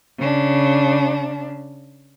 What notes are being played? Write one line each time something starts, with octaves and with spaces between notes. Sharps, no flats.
C#3 D4